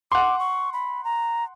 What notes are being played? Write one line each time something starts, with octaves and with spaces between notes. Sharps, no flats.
F#5 C6 D6
C#6
B5
A#5